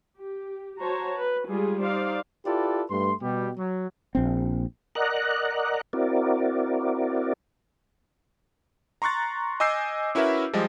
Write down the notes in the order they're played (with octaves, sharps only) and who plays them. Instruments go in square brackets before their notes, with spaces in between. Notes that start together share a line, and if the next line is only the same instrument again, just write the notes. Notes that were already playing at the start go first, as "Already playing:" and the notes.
[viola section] G4
F#4 C5 C#5 A5 A#5
B4
G3 G#3 F4 G#4
D#4 C5 D5 F5
[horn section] E4 F4 G4 A4 B4 D5
G2 A3 B4 C6
B2 G3 G4
F#3
[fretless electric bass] A#1 C4
[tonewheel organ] A#4 D5 D#5 F#5 A#5 F#6
C4 E4 F#4 A#4 D5
[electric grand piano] A#5 C6 C#6 F#6 A6
D#5 G#5 D6 E6 G6 C7
C#4 E4 F#4 A#4 B4 E5
F3 G3 G#3 D#5